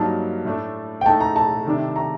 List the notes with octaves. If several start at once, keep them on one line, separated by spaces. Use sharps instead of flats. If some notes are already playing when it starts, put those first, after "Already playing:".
Already playing: G2 F#3 A#3 D#4 A5
A2 A3 D4
G5
A2 A3 D#4 A5
A#5
A5
C3 D#3 A3 D4
A#5